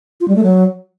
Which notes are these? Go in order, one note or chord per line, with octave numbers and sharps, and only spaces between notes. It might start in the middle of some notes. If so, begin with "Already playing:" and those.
F4
G3
A3
F#3